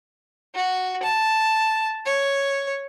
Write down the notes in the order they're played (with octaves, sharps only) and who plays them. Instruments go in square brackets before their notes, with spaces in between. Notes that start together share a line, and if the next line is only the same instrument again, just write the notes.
[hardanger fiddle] F#4
A5
C#5